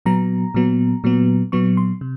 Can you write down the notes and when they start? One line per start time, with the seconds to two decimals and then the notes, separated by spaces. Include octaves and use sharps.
0.06 A#2 F#3 B3 A#5
0.54 A#2 F#3 B3
1.04 A#2 F#3 B3
1.52 A#2 F#3 B3 C#6
1.77 C6
2.01 C3